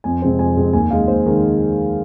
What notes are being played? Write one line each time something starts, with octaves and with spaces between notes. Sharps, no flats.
F2 G#5
C3 G#3 C4
F2 G#5
C3 G#3 C4
D#2 G#5
D#3 G#3 F5
D#2 C5
D#3 G#3